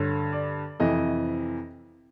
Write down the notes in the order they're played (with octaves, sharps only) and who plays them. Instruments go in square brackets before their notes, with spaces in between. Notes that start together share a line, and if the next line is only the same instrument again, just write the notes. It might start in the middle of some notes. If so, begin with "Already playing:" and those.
Already playing: [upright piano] G2 D3 C#5
D5
F2 C3 E3 D#5